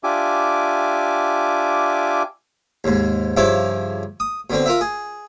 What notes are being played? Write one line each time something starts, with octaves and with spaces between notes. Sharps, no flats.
D4 F4 G4 E5 G#5 D6
D#2 G#2
G2 C#3 F3 E4 E5 D6
D#6
B2 D3 C4
F4 A#4 E5
G#4